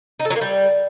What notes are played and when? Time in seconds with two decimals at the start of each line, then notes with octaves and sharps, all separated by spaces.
0.20 D#4
0.25 A4
0.30 F#3
0.36 A#3
0.41 G3